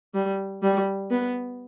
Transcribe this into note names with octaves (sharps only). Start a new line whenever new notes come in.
G3
G3
B3